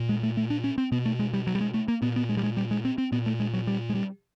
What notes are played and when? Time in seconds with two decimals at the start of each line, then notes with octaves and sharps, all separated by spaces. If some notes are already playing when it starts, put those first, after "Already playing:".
Already playing: A#2
0.09 G#3
0.23 A3
0.37 A3
0.50 D4
0.64 C#4
0.78 C4
0.92 B2 B3
1.05 A3
1.19 G#3
1.33 G3
1.47 F#3
1.55 G3
1.61 G#3
1.74 A3
1.88 A#3
2.02 A#2 B3
2.16 B3
2.29 G#3
2.37 G3
2.43 G#3
2.57 G3
2.71 G#3
2.85 C4
2.98 C4
3.12 A#2 B3
3.26 A3
3.40 G#3
3.53 F#3
3.67 G3
3.89 G#3
3.95 G3